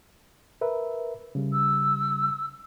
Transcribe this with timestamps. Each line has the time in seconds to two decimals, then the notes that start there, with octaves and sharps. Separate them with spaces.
0.61 A#4 B4 E5
1.35 C#3 G3
1.51 E6